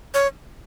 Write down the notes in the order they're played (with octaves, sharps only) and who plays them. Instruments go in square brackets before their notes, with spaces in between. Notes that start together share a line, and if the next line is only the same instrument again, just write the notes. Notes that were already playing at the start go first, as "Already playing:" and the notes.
[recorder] C#5